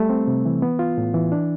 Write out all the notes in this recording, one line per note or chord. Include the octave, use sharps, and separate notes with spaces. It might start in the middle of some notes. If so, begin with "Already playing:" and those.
Already playing: G3 A3
C4
C3
E3
B3
F4
A2
E3
D4